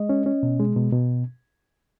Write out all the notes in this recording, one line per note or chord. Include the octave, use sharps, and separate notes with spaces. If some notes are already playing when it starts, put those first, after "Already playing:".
Already playing: G#3 D#5
C#4
C#4
B2
G#3
B2
B2